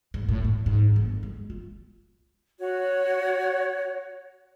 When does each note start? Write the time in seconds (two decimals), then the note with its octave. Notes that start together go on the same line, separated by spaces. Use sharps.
0.14 G#2
0.29 A2
0.44 A2
0.66 G#2
0.96 G1
1.23 G#3
1.50 F4
2.60 F#4 C#5